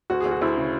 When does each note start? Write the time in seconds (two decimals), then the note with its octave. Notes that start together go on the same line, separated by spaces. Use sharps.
0.10 D2 F#4
0.21 D2 G#4
0.31 F#4
0.41 D2 E4
0.57 C#3